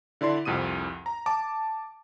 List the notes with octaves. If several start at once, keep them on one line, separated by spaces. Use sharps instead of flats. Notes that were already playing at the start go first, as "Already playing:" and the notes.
D3 E4 D5 C6
C2 F2 C3 D#6 D#7
A#5
A5 D6